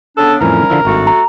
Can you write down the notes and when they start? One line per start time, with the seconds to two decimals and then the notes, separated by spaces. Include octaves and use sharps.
0.17 C#3 B3 D4 A4
0.41 F2 A2 E3 F3 G3 C#4 A#4
0.70 D3 F3 E4
0.85 G#1 G2 A3 F#4 A4
1.07 A#5